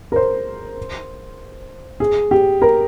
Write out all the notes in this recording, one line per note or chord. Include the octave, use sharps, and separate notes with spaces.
A#4
C5
G#4
G4
A#4